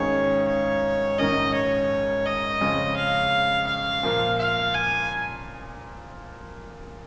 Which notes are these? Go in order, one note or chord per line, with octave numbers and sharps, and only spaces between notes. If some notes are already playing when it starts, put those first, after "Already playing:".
Already playing: G#1 G#2 D#3 C#4 G#4 C#5
C#5
A#1 G#2 D#3 C#4 A#4 D#5
C#5
D#5
F2 C#3 G#3 C#4
F5
F5
A#2 F3 A#3 F4
F5
G#5